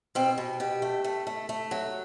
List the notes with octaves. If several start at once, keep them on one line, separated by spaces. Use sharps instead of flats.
B2 C4
B2
B2 G4
A3
A3
A3
A3
F#3